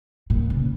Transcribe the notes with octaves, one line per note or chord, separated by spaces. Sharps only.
A#2
C#3